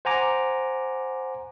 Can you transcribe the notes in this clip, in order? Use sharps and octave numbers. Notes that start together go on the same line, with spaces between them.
C5 F#5 G#5 A#5 D6